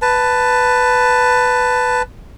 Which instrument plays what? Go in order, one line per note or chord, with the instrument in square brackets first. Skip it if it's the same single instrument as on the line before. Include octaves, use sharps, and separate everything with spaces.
[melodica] B4 A5